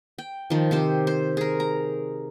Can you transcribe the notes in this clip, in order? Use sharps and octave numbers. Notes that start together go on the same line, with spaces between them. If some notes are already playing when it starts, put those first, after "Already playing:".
G5
D#3 F3
C3 G4 C5
C5
G#4 A#4
A#5